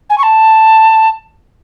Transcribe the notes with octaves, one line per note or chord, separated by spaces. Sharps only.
G#5
C#6
A5